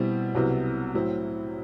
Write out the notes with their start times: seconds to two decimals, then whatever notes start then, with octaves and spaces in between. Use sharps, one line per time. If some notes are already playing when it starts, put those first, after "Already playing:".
Already playing: B2 G3 C4 E4
0.35 C2 C3 F#3 B3 E4
0.94 A2 F#3 C4 E4